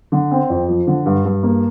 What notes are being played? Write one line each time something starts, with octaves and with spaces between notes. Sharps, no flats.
D3
C4
F2
F3
D3
G2
G2
A#3